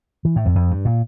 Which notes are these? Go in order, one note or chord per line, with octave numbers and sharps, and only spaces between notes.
E3
A2
F2
F2
G2
A#2